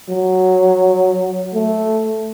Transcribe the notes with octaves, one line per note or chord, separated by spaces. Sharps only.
F#3
A3